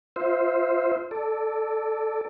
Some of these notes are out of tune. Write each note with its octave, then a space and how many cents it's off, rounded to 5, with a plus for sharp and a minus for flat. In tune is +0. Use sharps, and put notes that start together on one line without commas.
F4 +0 C5 +0 E5 -20
A4 +0 D5 +0